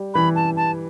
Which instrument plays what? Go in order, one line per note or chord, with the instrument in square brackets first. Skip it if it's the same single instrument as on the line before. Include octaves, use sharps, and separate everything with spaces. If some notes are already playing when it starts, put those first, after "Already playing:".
Already playing: [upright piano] G3
[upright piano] E3 [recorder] B5
[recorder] A5
A5